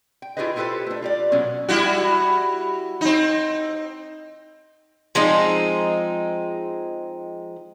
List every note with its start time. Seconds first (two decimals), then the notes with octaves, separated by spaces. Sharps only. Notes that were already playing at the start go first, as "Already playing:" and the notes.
0.22 G5
0.37 E4 F4 G4 G#4 B4 D#5
0.56 E4 F4 G4 A4 B4 C5
0.86 A3 D4
1.02 F4 G4 D5
1.32 B2 F#3 G#3 A#3 C#4
1.69 G3 E4 F#4
3.01 C4 D#4
5.15 F3 G#3 C4 D#4